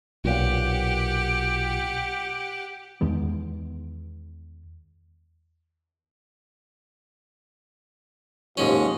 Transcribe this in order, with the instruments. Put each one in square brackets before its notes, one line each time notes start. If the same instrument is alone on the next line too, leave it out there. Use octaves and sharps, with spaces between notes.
[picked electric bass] B1 A#2 [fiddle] G4 F#5
[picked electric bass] E2 D#3 G#3 B3
[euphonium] D#2 [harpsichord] G#2 C#4 [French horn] F3 [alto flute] G4